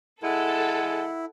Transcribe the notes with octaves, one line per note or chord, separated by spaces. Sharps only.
G#3 E4 A4 F#5